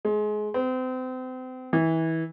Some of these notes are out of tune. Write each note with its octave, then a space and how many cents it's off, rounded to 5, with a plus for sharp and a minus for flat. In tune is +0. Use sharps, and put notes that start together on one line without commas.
G#3 +25
C4 -35
E3 -25